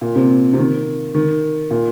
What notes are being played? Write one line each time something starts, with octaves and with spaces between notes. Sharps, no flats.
A#2
C3
C3
D#3
D#3
A#2